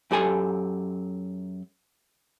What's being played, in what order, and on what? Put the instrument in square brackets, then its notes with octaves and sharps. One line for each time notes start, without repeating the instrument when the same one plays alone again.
[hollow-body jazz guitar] F#2 G4 A4 G#5